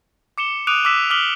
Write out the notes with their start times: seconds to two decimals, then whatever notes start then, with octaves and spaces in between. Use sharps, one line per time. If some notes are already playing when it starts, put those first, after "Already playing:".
0.38 D6 C#7 E7 G7
0.67 D6 D#6 F#6 D7 D#7 F7
0.85 D6 E6 B6 E7
1.10 D6 D#6 F6 B6 F#7 G7